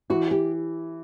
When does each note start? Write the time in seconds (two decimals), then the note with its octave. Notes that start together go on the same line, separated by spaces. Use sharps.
0.10 E3 F#4
0.31 G4